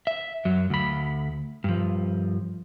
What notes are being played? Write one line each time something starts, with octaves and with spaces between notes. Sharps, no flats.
E5
F#2 F#3
D2 B5
G2 F3